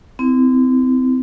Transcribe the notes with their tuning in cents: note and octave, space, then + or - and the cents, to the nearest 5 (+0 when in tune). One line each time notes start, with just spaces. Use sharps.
C4 -30 E4 -15